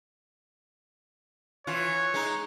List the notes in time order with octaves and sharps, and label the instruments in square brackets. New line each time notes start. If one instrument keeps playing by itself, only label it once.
[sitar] E3 F4 [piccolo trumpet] C#5
[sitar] G#3 D#4